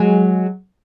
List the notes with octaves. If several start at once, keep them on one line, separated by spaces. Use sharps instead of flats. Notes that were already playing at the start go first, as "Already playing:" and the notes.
Already playing: F#3 G#3